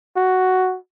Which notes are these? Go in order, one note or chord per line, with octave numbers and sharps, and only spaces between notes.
F#4